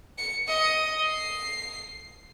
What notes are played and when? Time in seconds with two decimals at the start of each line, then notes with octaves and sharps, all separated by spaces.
0.18 C#7
0.47 D#5 C#7
1.07 C7